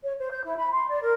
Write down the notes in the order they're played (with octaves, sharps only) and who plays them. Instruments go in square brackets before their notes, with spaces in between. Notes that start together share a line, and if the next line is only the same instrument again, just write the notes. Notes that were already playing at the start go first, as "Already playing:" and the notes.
[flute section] C#5
C5
G6
E4
B5
C6
D5
A#4